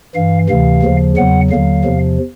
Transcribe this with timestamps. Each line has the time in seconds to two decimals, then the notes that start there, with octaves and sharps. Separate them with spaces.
0.15 G2 E3 F5
0.49 D2 C3 E3 F5
0.83 D#2 C#3 F3
1.17 E2 C#3 F#3 F#5
1.51 D#2 D3 F#3 F5
1.85 E2 C3 F3